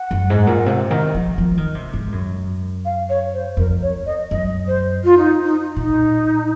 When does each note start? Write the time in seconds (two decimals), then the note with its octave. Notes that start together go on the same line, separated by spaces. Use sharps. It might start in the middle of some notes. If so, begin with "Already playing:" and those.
Already playing: F#5
0.11 F#2
0.30 G#2
0.47 A#2
0.66 C3
0.91 D#3
1.14 F3
1.38 F3
1.57 D#3
1.75 C3
1.93 G#2
2.12 F#2
2.85 F5
3.09 C#5
3.33 C5
3.57 F2 A#4
3.82 C#5
4.06 D#5
4.31 F#2 D#5
4.67 C5
5.04 F4
5.17 D#4
5.44 D#4
5.76 A#2 D#4